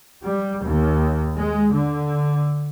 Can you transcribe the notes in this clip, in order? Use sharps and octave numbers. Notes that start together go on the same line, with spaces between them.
G3
D#2
G#3
D3